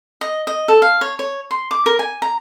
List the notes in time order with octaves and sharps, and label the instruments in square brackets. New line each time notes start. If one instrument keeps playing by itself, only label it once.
[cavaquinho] D#5
D#5
A4
F5
C#5
C#5
C6
D6
A#4
G#5
A#5